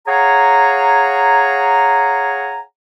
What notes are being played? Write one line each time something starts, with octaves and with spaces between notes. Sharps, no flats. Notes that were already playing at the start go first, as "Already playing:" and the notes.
G#4 C#5 F5 F#5 G#5 A#5